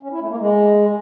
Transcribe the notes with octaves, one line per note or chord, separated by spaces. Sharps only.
C#4
E4
A3
A#3
G#3